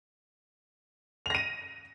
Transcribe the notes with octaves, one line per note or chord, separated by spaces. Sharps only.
A#6 D#7 F7